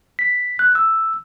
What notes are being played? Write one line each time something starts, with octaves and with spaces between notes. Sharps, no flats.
B6
F#6
E6